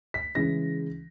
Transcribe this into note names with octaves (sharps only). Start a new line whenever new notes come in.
B6
C#3 E3 G#3 A#6